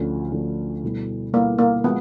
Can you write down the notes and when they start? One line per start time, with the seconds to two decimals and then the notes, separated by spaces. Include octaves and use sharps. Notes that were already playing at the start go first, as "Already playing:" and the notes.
Already playing: D2 D3 F3 A3 C#4
0.31 D2 D3 F3 A3 C#4
0.83 B2 G3 B3 E4 A4
1.33 B2 G3 A#3 B3 E4 A4
1.58 A#3
1.84 F3 G#3 B3